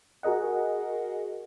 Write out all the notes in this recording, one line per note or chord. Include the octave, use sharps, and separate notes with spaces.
F#4 G#4 A#4 D#5 F#5